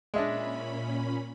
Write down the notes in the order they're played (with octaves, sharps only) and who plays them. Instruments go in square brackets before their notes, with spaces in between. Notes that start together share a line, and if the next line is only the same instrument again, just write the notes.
[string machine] A#2 C#4 B5 [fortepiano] G#3 D4 [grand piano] D#5 E5